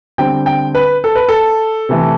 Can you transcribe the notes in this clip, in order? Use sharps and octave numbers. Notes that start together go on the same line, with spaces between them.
D3 G3 C4 G5
G5
B4
A4
B4
A4
C3 E3 A3